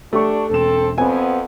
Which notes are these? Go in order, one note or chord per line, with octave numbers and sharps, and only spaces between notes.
A3 D4 G4 C#6
E1 C4 A4 E7
F2 B3 C4 C5 F#5 G#5